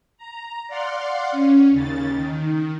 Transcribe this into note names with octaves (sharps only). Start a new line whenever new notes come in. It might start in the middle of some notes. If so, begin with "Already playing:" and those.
A#5
D5 F5 F#5 C6
C#4
D#2 C#3 A6
D#3